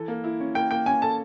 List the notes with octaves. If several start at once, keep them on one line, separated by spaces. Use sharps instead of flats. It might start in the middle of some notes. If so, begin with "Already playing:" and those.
Already playing: E3 A4
A#3
E4
C#4
A#3 G5
A#3 G5
C#4 G#5
A4 A5